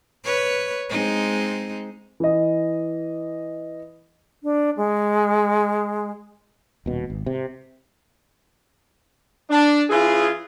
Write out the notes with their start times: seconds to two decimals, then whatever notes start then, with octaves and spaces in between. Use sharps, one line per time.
0.24 B4 C#5
0.89 G#3 C4 D#4
2.20 E3 D#5
4.43 D4
4.77 G#3
6.86 D#1 B2
7.10 G#1
7.26 C3
9.50 D4
9.90 E3 C#4 F4 G#4